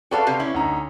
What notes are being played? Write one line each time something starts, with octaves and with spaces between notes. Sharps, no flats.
F#4 A4 B4 D5 F5 G5
C3 G4 F5
C#4 E4
D2 D#4 A#5